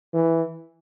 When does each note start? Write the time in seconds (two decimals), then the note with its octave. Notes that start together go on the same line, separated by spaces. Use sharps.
0.14 E3